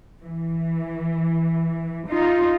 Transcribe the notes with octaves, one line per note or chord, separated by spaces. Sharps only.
E3
D#4 F4